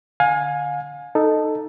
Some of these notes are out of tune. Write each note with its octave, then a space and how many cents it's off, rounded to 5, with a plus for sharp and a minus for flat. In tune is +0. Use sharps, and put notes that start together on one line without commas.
D3 +0 F5 +35 G#5 +0
D#4 -10 A4 +0